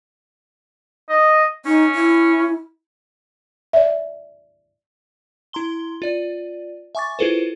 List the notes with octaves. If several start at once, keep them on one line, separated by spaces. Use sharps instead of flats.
D#5
C#4 D#4
E4
D5 E5
E4 A#5 C6 G7
F4 D5
E5 G#5 C#6 D6 A6
E4 F4 G#4 A4 B4 C5